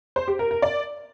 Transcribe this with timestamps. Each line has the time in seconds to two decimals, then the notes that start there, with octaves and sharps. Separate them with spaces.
0.16 C5
0.28 G4
0.39 A#4
0.51 A#4
0.62 D5